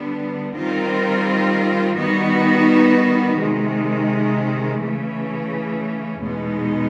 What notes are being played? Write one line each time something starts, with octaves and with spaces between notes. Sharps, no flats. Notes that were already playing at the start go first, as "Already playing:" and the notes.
Already playing: D3 G3 B3 D4
D#3 G3 C4 F4 A#4
D#3 G3 B3 D#4 F#4
C3 D#3 G#3
C#3 E3 A3 C#4
E2 B2 G#3 B3 D#4